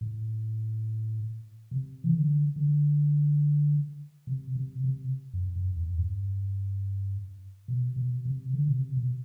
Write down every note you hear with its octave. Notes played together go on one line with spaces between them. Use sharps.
A2
C3
E3
D3
D3
C3
C3
C3
F#2
F#2
E2
G2
B2
B2
C3
D3
B2
C3
B2